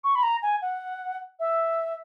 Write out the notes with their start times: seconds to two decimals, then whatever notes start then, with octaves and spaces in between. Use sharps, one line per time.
0.04 C#6
0.15 B5
0.23 A#5
0.43 G#5
0.62 F#5
1.40 E5